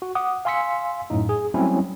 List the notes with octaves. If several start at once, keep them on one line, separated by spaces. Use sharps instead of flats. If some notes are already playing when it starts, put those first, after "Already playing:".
F#4
F#5 D6 D#6
F5 G#5 C6 E6 B6 C#7
F#2 A2 D#4
G#4
F#3 G3 A3 C4 C#4 E4